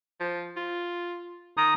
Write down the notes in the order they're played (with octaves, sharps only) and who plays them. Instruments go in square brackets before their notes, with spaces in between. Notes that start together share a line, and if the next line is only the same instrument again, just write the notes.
[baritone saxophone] F3
F4
[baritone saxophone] D#3 [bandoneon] A#5 D#6